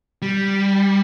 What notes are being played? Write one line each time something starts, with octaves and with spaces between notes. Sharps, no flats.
G3